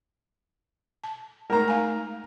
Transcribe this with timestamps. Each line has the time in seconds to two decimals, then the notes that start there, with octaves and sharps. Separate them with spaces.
1.04 A5
1.50 G#3 A3 D#4 A#4 A#5
1.68 F5 G#5